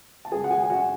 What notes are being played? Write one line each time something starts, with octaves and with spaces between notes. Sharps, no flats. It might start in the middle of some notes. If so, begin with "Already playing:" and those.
A5
F#2 C#3 G#3 G#4 G#5
F#5
G#4 G#5
G#5
F#4 F#5